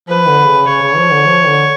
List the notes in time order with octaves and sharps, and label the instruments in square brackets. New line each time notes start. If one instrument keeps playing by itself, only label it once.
[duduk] F3 [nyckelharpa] B4
[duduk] D3
C#3
[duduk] C#3 [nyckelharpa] C#5
[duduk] C#3
F3
D3
F3
D3